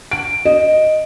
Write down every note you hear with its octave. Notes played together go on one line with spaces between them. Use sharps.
D7
D#5